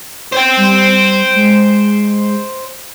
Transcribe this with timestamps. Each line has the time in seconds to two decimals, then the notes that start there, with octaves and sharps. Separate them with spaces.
0.32 C5 G5
0.57 G3
1.35 G#3